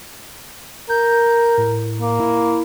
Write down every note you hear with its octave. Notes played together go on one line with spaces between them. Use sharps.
A#4 G6
A2
A#3
E4